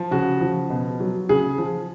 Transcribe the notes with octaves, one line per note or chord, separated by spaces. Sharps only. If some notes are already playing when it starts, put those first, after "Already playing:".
Already playing: F3
C#3 F#4
F3
B2
F#3
C#3 G#4
F3